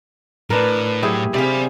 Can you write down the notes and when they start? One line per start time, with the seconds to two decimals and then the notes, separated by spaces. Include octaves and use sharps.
0.50 A2 D4 A#4 B4
1.03 F#3 E4 G4 G#4
1.34 C3 C4 G#4 D5 F5 B5